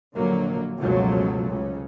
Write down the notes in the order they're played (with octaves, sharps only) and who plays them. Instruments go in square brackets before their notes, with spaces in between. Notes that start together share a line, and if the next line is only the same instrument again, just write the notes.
[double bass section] A#1 D3 F#3 A#3
C#2 F#2 B2 F3 F#3 A3
C#2 C#3